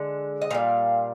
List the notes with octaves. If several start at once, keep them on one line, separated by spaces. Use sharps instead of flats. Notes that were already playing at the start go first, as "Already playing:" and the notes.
Already playing: D3 G#3
D#5
A#2 G3 F5